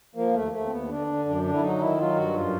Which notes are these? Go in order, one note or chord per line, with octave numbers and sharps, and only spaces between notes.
F3 A#3
D#2 A3
D#2 A3
C4
D#2 B3
D3 D4
D3
F#2 D4
D3 D4
E4
F#3 D#4
D#3 E4
F#3 F4
G2 F#4
F#2 F4